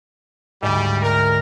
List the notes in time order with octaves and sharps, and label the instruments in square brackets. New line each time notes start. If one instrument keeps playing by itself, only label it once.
[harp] D2 G#2 [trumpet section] G3
[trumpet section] A#4